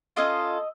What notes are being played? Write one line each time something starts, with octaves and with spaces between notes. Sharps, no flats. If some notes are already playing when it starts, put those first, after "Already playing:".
C#4 F4 A4 D#5